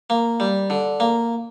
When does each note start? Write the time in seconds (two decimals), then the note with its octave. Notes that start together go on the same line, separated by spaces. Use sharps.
0.10 A#3
0.40 G3
0.70 D3
1.00 A#3